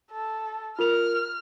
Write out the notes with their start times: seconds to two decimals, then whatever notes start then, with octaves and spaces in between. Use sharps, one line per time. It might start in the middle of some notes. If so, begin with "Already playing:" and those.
0.12 A4
0.79 F4 A#4 F6 F7